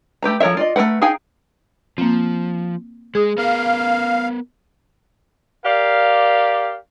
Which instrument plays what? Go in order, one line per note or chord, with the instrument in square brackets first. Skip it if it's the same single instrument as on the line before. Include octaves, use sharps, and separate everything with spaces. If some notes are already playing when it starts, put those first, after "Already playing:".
[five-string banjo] A3 G4 B4 A#5
F3 A4 A#4 C#5 E5
F4 D5 D#5
A3 F4 A#4 B4 F#5
D#4 G#4 F5 G5 G#5
[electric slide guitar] F3 [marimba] A#3 C4
[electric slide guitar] G#3 [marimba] G#4 D#6
[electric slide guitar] B3 A#4 [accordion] F5
[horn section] G4 A#4 D5 F5